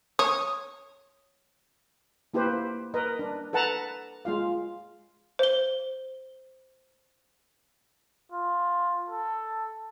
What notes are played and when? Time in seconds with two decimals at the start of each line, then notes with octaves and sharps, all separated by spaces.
0.19 C#5 D#6
2.34 A#3 E4 G4 B4 C5
2.94 A#4 B4 D#5
3.19 D4
3.53 A4 B4 F#5 A5 A#5
4.25 G#3 F4 F5
5.39 C5 G7
8.32 F4
9.10 A4